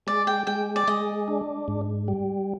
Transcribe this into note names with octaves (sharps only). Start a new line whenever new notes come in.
G#3 D5
G5
G#3 G5
D5
G#3 D#5
D4
G#2
G3